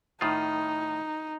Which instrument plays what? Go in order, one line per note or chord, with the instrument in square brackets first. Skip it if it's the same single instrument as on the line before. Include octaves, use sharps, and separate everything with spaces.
[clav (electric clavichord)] A2 D#3 F4 [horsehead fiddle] D#4